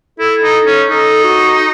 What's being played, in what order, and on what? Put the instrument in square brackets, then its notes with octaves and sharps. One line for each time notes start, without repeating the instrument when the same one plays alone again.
[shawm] E4 [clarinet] A4
[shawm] D#4
C#4
[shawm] D#4 [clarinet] A4
[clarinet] F#4